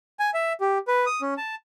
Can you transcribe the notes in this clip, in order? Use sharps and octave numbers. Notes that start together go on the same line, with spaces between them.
G#5
E5
G4
B4
D#6
C#4
A5